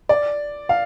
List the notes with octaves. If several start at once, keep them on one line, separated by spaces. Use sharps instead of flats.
D5
F5